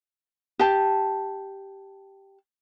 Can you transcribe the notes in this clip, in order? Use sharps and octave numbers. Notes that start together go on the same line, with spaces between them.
G4 A5